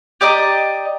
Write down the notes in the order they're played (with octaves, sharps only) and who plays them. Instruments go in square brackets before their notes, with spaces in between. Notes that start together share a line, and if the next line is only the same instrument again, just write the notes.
[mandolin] G4 D5 D#5 A#5